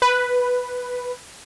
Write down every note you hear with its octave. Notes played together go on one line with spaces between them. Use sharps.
B4